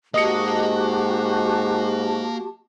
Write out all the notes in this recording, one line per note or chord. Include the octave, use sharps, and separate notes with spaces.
G#2 A#3 F#4 G4 D#5 A5 D#6 C#7